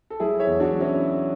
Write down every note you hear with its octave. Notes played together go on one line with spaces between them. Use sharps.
A4
F#3 E4 G#4
C#5 E5
E2
D4 F#4
F#3
C#4 E4
F#3